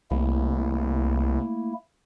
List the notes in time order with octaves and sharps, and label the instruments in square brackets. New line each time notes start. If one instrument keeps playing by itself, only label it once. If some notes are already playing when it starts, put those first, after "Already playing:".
[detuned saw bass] C2 [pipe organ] A3 A#3 E4